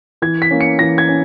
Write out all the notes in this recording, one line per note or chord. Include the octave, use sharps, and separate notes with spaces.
E3 G#6
B6
A#3 C#4
C#7
E3 A#6
G#6
C#4